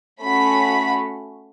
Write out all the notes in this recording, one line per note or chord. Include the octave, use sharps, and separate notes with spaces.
A3 C#4 F#4 B5